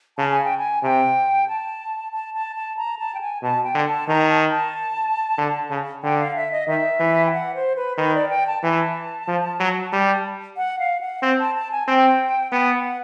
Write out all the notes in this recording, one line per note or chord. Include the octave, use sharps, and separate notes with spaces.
C#3 A5
G#5
G5
G#5
C3 G5
A5
A5
A5
A5
A#5
A5
G5
G#5
B2 A5
G5
D3
A5
D#3 A#5
A5
A5
D3
C#3
D3 G5
F5
E5
D#5
D#3 E5
E3
G5
F#5
C5
B4
D#3 B4
D5
G5
A5
E3 A5
F3
F#3
G3
F#5
F5
F#5
C4 G5
A5
A5
G#5
C4 G5
B3 G5
F#5